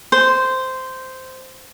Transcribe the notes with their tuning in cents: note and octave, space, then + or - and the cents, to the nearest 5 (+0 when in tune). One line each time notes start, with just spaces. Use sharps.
C5 -10